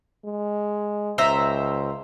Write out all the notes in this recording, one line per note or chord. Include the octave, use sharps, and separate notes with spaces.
G#3
C#2 C5 E5 A#5